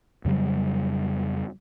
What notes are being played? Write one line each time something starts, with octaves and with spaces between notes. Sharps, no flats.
F2 C#3 F#3 G3